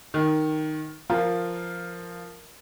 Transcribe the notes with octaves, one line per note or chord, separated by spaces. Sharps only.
D#3
F3 F4 A#4